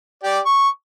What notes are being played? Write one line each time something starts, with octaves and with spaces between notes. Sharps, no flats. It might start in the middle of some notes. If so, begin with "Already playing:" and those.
G4 D5
C#6